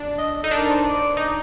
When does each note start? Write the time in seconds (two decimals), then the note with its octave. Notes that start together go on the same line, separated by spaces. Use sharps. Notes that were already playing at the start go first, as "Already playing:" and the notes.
Already playing: D4
0.18 D#5
0.43 D#4 A4
0.51 D4
0.56 A#4
0.70 C5
0.84 D5
1.17 D#4